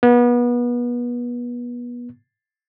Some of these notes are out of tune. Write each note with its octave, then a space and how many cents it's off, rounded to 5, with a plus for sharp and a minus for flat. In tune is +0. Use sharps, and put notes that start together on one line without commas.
B3 -30